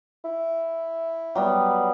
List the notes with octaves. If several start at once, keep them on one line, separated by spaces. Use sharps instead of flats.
E4
F#3 G3 B3